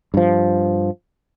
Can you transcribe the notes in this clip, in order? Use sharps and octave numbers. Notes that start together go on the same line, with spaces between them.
G2 F3